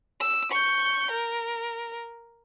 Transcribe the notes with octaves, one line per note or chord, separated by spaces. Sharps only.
E6
C#6 G6
A#4